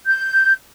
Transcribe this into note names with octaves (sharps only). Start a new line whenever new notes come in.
G6